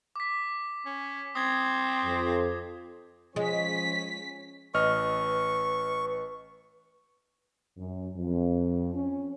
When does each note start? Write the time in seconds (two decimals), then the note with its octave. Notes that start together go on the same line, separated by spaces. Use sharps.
0.16 D6 B6
0.86 C#4
1.35 C4 D#6 G#6
2.04 F2
3.36 F3 G#3 C#4 B6
4.74 A1 B4 D#5 C#6 F6
7.77 F#2
8.17 F2
8.94 C#4